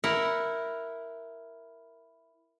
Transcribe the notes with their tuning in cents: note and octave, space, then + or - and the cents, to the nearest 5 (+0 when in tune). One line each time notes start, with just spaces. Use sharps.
E4 +0 A#4 +0 F#5 +0